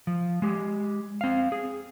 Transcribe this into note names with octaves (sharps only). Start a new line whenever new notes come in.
F3
G#3 G4
C4 F5
G#4